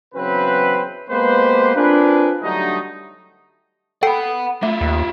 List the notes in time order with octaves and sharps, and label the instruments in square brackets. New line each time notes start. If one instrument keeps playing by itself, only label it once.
[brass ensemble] E2 C#3 F#3 C4 B4
G#3 A#3 B3 G4 B4 C5
C4 D4 F4 G#4 A#4 B4
D3 F#3 G3 A3 D4 D#4
[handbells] A4 G5 C7 [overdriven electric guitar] F#5 B5
[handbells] A3 [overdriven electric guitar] E4 F4
[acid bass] D#2